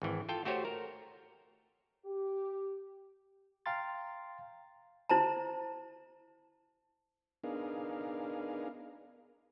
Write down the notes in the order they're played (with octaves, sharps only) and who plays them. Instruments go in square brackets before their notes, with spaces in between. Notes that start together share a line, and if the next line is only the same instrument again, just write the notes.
[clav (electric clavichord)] G#1 E3
F4 A4 G5
A3 F#4 G4 C5 C#5
A#4
[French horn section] G4
[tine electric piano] F5 G5 A#5 C6 A6
[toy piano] E4 C5 A5 A#5
[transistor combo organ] B3 D4 D#4 G#4 A#4 F5